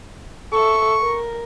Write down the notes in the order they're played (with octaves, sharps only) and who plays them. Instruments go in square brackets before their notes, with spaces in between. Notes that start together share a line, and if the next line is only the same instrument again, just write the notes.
[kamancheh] A4 E5 [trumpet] C#6
[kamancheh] A#4